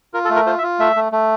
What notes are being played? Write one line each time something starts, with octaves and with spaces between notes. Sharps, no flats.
F4 A#4
A4
A3
A#4
F4 C5
E5
F4
A3 E5
A3
A3